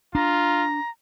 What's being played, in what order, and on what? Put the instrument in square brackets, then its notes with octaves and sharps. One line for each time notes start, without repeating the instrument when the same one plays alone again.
[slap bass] D4 [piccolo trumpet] F4 [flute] A#5